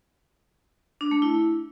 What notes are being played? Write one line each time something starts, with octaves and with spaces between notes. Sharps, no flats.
D4
A3
E4